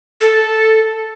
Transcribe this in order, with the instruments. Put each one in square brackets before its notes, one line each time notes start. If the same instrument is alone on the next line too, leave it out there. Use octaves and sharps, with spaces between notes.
[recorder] A4